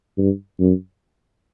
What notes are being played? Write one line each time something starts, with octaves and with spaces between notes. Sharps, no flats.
G2
F#2